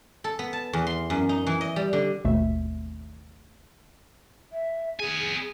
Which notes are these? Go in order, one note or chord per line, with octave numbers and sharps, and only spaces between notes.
A4
B3
A5
E2
C6
F#2
D#4
E3
D#5
G3
D3
G#1 D#2 B2 A3 E5
E5
B3 G#4 G#5